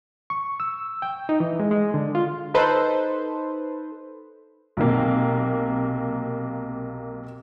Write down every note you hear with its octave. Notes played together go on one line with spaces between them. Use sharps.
C#6
E6
G5
D#4
E3
G#3
G#3
D3
F4
D#4 A4 B4 C5
B1 C3 A#3